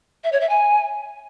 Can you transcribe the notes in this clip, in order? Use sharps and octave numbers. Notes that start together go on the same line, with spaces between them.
E5
C#5
E5
G#5